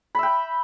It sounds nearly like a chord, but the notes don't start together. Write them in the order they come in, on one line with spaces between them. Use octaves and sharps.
B5 E5 G5